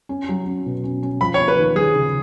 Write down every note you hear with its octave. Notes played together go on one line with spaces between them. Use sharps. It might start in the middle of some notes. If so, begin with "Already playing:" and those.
C#4
F#3
C#4
B2
C#4
C#4
F3 B5
C#5
A#3
B4
D#2
F3 G#4
C#3